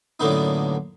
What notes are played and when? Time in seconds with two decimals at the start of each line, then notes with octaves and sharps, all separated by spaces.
0.20 F#2 A2 D3 A#3 B3 D#4